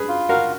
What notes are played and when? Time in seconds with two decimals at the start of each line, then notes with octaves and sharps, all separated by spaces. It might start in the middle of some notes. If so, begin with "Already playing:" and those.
Already playing: G#4 B4
0.09 F4
0.29 F#4 A#4 F5